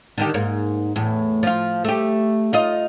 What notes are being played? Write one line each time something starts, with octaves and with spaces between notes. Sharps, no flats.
D3 D#3 G4
G#2 A#3
E2 A2
F3 F4
A3 G4
D#4 F4 D#5